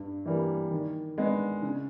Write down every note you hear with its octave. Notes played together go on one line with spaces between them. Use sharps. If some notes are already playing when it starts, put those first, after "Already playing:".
Already playing: G2
E3 G3 A#3
D#3
G#3 B3 D4
C#3